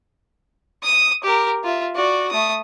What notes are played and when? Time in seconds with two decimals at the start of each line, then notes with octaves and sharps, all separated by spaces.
0.83 D#6 D#7
1.24 G4 A#4
1.64 F4 E5
1.95 F#4 D5
2.31 A3 D#6